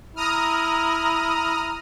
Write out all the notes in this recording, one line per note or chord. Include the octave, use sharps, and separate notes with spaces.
E4 A#5 D#6 F6